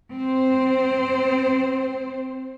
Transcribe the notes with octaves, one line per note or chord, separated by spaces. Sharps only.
C4 C5